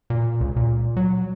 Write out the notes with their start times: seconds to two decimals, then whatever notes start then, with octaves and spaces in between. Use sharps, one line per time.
0.10 A#2
0.41 C#2
0.56 A#2
0.97 F#3